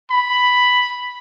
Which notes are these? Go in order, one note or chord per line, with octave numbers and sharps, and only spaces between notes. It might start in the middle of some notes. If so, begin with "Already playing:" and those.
B5